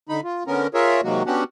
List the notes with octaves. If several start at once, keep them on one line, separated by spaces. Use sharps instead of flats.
D3 D#4 B5
F4
D3 B3 C#4 A#4
F4 G#4 A#4 C#5 E5
C3 D#3 F#3 G#3 A#3 F#4
B3 C#4 D4 F#4 G4 F#5